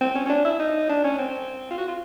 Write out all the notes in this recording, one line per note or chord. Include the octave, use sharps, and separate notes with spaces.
C4
C#4
C#4
D4
E4
D#4
D4
C#4
C4
F4
F#4
F4